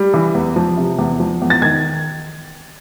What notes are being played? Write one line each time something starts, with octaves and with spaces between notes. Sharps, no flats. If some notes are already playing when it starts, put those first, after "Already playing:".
Already playing: G3
E3
E2
F3
C3
E2
F3
E2
A6
D#3 G#6